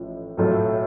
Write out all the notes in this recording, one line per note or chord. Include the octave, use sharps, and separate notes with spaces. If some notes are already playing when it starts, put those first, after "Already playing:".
Already playing: A1 A2 F3
B1 A2 F#3 A3 F4